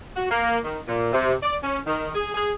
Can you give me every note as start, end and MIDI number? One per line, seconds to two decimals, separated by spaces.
0.16 0.26 66
0.31 0.59 58
0.65 0.80 51
0.88 1.11 46
1.13 1.34 48
1.43 1.56 74
1.63 1.79 61
1.86 2.10 51
2.15 2.33 68
2.35 2.53 68